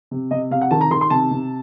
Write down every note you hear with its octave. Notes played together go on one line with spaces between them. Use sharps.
C3
C3 D#5
C3 F5
F#5
D#3 A5
A#5
D#3 C6
C6
C3 A5
C3